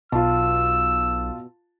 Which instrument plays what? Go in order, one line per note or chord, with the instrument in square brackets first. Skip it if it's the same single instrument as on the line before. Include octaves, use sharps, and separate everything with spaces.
[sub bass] B1 [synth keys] B2 [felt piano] F4 A5 [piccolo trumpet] E6